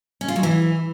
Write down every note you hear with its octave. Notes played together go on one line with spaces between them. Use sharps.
C#4
F4
F#3
E3